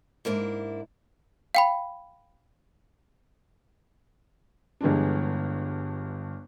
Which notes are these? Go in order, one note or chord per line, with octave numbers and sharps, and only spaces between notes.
G#2 A#3 D4 E4
F5 G5 B5
G1 G2 E3 G#3 D4